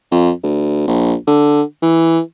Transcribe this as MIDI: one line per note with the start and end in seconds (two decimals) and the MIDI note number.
0.12 0.31 41
0.43 0.85 38
0.87 1.15 34
1.27 1.62 50
1.82 2.20 52